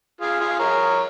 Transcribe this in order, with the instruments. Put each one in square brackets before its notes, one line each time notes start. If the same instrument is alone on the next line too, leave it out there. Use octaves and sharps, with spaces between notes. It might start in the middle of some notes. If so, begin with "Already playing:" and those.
[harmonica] F4 G#4
F4 G#4
A#4 C#5